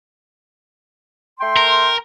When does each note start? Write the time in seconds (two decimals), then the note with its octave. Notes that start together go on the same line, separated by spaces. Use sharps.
1.41 A3 G5 C6
1.57 A#4